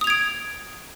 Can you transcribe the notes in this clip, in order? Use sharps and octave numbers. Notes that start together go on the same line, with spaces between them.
D#6 G#6 D7 F7